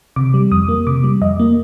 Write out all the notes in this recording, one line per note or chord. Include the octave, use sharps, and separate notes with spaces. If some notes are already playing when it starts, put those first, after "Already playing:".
C3 D6
G3
F2 D#6
A#3
C3 D6
G3
F2 D#5
A#3